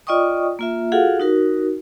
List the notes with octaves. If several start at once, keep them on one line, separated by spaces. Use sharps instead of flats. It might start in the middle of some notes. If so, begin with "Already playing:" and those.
F4 D5 D#5 G5 C#6 D#6
A#3 F4 E5
F4 F#4 G#4 A4 F5 F#5
D#4 F#4 A#4